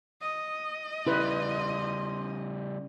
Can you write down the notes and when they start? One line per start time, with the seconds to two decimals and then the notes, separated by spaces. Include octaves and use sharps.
0.21 D#5 D#6
1.07 C#3 G3 E4 B4 C6